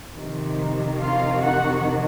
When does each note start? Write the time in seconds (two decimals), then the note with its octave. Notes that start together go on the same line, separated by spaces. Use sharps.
0.12 F2 C3 D#3
0.99 F4 F5
1.41 F#4 F#5